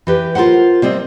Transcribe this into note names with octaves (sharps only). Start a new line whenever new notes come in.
E3 G4 B4
F4 A4 A#4 C5 F#5
C3 G3 C4 D#5